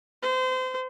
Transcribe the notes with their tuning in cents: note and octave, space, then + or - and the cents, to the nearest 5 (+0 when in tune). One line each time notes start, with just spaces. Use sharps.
C5 -30